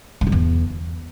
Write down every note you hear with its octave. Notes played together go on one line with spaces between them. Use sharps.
G#2
G2
E2